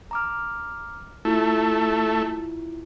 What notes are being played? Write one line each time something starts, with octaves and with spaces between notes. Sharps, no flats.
A#5 D6 F6
A3 E4 F4